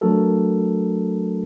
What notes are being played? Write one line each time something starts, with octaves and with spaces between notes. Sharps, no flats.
F#3 A3 D4 F#4 A4 A#4